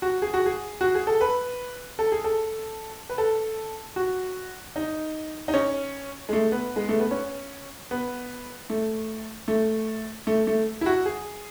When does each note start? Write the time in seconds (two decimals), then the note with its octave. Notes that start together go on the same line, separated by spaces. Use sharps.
0.02 F#4
0.22 G#4
0.34 F#4
0.46 G#4
0.81 F#4
0.95 G#4
1.07 A4
1.21 B4
1.99 A4
2.12 G#4
2.24 A4
3.09 B4
3.18 A4
3.96 F#4
4.76 D#4
5.48 D#4
5.54 C#4
6.29 G#3
6.33 A3
6.52 B3
6.76 G#3
6.89 A3
7.00 B3
7.11 C#4
7.91 B3
8.70 A3
9.48 A3
10.27 A3
10.47 A3
10.81 E4
10.86 F#4
11.06 G#4